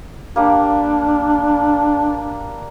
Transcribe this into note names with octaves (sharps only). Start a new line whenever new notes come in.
G3 A#3 D4